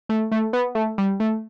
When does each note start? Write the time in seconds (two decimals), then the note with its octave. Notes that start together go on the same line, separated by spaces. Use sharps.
0.09 A3
0.31 A3
0.53 B3
0.75 A3
0.98 G3
1.20 A3